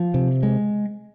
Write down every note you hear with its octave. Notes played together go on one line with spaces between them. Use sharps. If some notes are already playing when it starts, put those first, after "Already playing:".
Already playing: F3
C3
G#3